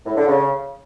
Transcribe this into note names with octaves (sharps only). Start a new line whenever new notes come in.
A2
D3
C#3